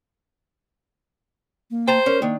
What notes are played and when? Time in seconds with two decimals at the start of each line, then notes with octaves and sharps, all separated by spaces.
1.71 A#3
1.88 C5 G5 A5 A#5
2.06 C#4 A#4
2.22 D#3 A#3 D4